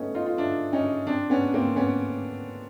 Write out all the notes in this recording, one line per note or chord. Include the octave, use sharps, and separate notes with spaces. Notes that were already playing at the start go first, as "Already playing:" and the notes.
Already playing: A3 B3 C#4 D#4
D#4 F4
F4
D4 E4
C#4 D#4
C4 D4
B3 C#4
A#3 C4
B3 C#4